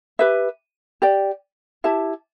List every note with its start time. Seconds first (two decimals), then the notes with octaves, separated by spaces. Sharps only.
0.19 G4 B4 E5
1.02 G4 D5 G5
1.84 E4 G4 E5 A5